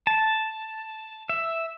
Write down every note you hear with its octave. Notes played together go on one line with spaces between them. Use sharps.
A5
E5